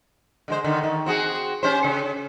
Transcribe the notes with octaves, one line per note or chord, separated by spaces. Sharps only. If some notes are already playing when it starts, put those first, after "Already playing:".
D3 G#3 C5
D3 D#3
D#3
C4 F#4 G#4
C#4 G4 C5
C#3